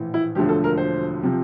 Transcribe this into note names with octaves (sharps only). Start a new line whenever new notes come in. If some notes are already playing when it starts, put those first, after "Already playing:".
Already playing: A#1 A2 E3
E4
E1 D2 D3 F3 G4
A4
A#4
C5
C3 F3